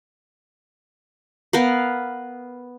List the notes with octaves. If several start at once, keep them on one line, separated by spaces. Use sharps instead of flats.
B3 A#4 F5